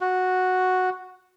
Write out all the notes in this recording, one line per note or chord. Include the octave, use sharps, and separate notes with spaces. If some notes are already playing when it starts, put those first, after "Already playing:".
F#4